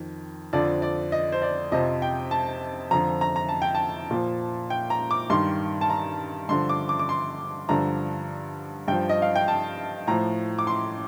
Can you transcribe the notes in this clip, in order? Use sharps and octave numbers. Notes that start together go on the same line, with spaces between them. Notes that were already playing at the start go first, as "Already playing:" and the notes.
Already playing: F2 D#3
F2 D3 F3 D5
D5
D#5
C5
D5
F2 C3 F3 D#5
G5
A5
F2 D3 F3 A#5
A#5
A#5
A5
G5
A5
A#2 F3
G5
A#5
D6
G2 D#3 C6
A5
A#5
G2 D3 F3 C6
D6
D6
D6
C6
G2 D3 F3 A#5
G2 F3 G5
D#5
F5
G5
A5
A2 F3 A#5
D6
C6